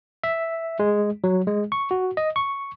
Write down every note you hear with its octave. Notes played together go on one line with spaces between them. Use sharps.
E5
G#3
F#3
G#3
C#6
F#4
D#5
C#6